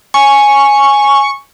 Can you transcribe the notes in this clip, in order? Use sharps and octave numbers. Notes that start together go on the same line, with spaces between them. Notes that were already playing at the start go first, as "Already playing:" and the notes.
G#5 C#6